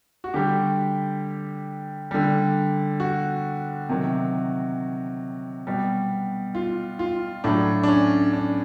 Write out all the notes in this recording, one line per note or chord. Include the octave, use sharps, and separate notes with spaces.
F#4
D3 G3 G4
D3 G3
F#4
C3 D#3 F#3
B2 G3
F4
F4
A2 F#3 D4
D4
C#4
D4